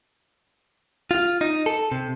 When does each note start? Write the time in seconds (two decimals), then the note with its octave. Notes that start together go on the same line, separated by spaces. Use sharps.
1.11 F4
1.41 D#4
1.66 A4
1.92 C3